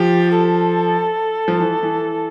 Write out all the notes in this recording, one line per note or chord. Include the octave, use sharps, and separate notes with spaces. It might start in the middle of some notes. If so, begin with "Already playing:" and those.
Already playing: F3 G4
A4
F3
E3
E3